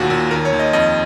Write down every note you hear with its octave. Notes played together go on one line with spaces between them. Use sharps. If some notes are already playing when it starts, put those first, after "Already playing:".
Already playing: D#2 A#2 F#4
A#2
D#2 A#4
C#5
D#2
D#5
F2 D#5